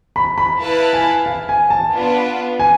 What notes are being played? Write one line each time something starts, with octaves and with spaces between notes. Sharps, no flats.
B5
B5
E4 B4 F5 A5
G#5
F5
G#5
A5
B3 D4 F4 B4
G#5